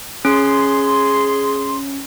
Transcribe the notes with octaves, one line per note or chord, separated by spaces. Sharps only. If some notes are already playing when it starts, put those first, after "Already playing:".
C#4 G#4 C6